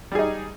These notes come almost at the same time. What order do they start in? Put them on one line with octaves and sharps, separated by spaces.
G3 G#4 D#4